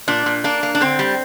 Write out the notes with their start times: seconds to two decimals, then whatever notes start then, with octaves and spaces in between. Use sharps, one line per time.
0.08 A#2 D4
0.26 A#2
0.44 A#3 D4
0.63 A#3
0.75 D4
0.80 D3 C4
0.99 G3